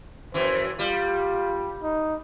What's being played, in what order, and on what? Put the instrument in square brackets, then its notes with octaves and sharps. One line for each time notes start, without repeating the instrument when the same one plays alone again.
[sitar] F#2 E3 [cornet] C5
[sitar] G3 [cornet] F4
[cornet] D#4